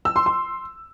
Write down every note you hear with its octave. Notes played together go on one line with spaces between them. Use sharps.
E6
C6
C6